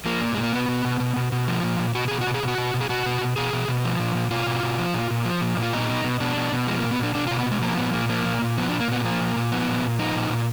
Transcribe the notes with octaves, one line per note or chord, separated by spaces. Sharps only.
F3 A#3
A#2
A#2 G#3
A#3
B2 B3
B2
B2
B2
B2
B2
F3
A#2
A#2
B2 F#4
B2 G#4
F#4
B2
G#4
B2
F#4
B2
B2
G#4
B2 F#4
B2
B2
B2 G#4
B2
B2
F3
A#2
A#2
B2 F4
B2
B2
F3
A#2
A#2
F3
A#2
A#2
F4
B2 D#4
B2
B2
B2 D4
B2
B2
F3 G#3
A#2 A#3
B3
A#2 D4
B2 D4
F4
B2
B3
B2
G#3
F3 A#3
A#2 B3
A#2 A#3
F3 A#3
A#2
A#2
F3 B3
D4
A#2
A#3
A#2 B3
F3 A#3
A#2
A#2
F3 B3
A#2
A#2
F3 D#4
A#2
A#2